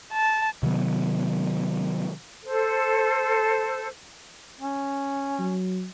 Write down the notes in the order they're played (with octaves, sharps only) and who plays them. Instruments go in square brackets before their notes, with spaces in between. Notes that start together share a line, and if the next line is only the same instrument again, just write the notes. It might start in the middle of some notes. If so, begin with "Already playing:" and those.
[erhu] A5
[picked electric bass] C3 D#3 F#3 B3
[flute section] A4 C5
[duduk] C#4
[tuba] F#3